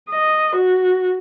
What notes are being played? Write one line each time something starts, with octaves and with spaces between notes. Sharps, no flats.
D#5
F#4